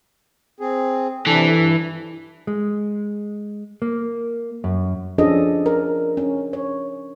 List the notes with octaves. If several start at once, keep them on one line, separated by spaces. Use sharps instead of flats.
C4 G#4
C3 E3 D4 A4
G2
G#3
A#3
F#2
F3 C#4 D4 G#4 A4 D#5
A#4
C#4
C#5